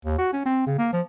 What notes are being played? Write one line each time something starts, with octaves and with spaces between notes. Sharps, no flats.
D#2
F#4
C#4
C4
C#3
A#3
F3